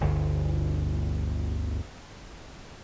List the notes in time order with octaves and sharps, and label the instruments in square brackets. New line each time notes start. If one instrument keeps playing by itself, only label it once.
[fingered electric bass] G1 D2